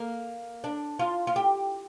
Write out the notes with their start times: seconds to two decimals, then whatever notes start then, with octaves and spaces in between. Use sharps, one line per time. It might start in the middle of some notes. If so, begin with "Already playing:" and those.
Already playing: A#3
0.64 D4
0.99 F4
1.27 F4
1.36 G4